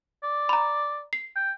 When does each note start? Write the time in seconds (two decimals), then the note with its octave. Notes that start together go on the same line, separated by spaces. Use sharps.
0.24 D5
0.49 A#5 B5
1.13 C7
1.36 G5